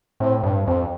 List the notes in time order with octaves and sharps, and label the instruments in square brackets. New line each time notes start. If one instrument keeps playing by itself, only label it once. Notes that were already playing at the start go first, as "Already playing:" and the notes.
[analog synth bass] A2 [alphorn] C4
[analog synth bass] G2
[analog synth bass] F2 [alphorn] C4